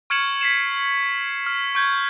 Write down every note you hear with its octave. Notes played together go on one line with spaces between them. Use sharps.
C#6 F6 G#6 C#7 E7 F#7
B6 C7 E7
F6
C#6 G6 G#6